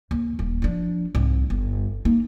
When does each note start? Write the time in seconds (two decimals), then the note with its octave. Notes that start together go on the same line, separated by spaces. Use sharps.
0.11 D#2
0.39 D#1
0.62 F3 D4
1.15 C2 G#2
1.50 G1
2.05 A#3 D#4